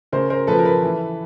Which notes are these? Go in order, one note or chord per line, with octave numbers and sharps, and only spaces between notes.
C#3 A#4 C5
A#4 C5
F3 A4 B4
A#4
A4 B4
E3